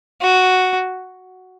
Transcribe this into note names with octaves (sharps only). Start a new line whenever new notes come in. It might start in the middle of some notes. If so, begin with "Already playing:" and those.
F#4